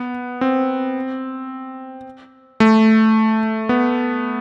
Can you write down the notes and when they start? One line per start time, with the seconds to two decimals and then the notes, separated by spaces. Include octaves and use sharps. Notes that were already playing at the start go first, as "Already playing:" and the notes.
Already playing: B3
0.41 C4
2.60 A3
3.69 B3